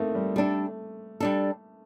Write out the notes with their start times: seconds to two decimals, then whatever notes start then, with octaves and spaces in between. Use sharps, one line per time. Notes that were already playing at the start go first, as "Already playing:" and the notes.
Already playing: A3 A#3 C4 D#4
0.15 G3
0.36 G3 A3 D4 A4
1.20 G3 D4 A4